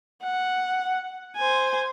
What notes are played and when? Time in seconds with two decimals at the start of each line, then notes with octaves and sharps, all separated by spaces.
0.24 F#5
1.37 C5 G#5